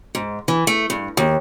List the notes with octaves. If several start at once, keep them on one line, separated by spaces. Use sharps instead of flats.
G#2
E3
A3
G2
D#2